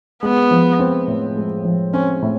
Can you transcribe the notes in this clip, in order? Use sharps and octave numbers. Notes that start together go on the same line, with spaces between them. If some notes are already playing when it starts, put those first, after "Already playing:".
G#3 B3
F3
C4
A2
G#3
F3
C4 C#4
A2